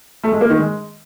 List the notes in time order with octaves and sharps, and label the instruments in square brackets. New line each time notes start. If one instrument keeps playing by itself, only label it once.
[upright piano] A3
G#3
A#3
D#3
G#3